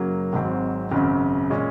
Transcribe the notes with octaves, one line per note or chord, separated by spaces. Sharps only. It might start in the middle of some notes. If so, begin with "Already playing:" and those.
Already playing: F#2 C#3 F#3 A#3
G#1 G#2 F#3 C4
G#1 F#2 C#3
A#2 G#3 C#4